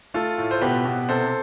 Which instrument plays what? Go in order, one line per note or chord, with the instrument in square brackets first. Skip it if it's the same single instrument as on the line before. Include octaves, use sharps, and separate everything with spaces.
[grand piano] A3 F4 A4
A2
C5
B2 G4 B4
B2
C3 A4 C5